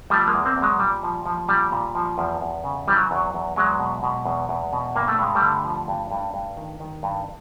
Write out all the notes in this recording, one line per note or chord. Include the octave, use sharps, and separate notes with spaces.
F3 G3 A3
G#3 A#3
E2
A#3 C4
E2
F#3 G#3
A#2 G3
F3
F3
A#2 G3
A#2
F3
E2
E2
C#3
E3 G3
F#3
E2 F#3
E2
E2 F#3 G#3
B2
B2
E2
E2
B2
G2 A#3
A3
G2 G#3
G3 A3
D3
F3
G2
G2
G2
D#3
D#3
G2